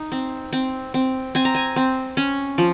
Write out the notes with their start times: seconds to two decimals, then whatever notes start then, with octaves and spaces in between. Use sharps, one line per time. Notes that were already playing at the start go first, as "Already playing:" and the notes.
Already playing: D#4
0.12 C4
0.53 C4
0.94 C4
1.35 C4 G#5
1.45 A#5
1.55 G#5
1.76 C4
2.17 C#4
2.58 F3